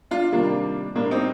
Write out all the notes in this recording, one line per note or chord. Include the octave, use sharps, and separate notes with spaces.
D4 F4
C3 D#3 G3 A#3 D4
A2 G3 A#3 D4
C4 D#4